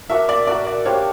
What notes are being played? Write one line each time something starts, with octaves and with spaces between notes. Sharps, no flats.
D4 F#4 A#4 E5
D5
D4 F#4 A#4 D5
D5
D4 G4 C5 C#5 F5